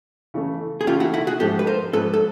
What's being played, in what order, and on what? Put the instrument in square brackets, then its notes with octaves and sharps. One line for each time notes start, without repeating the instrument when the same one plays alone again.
[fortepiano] C#3 E3 A3
[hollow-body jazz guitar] G#4
[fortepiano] C#3 E3 A3 [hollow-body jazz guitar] F4 G4
[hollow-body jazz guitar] E4 F#4
E4 F#4
F#4 G#4
[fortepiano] G#2 F3 A3 [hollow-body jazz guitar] G4 A4
[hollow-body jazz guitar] B4
A#4 C5
[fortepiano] G#2 F3 A3 [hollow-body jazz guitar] A4 B4
[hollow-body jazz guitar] A4